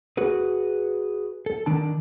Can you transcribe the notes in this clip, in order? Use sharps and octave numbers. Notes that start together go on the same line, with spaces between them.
F#4 G#4 B4
A4
D#3 D4 A5